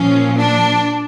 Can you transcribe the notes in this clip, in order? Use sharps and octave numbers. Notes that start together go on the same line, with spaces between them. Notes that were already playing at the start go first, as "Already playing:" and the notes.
Already playing: A#2 F3 C#4
D4